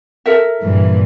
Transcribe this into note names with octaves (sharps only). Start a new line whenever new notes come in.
A4 A#4 E5
G2 A#2 E3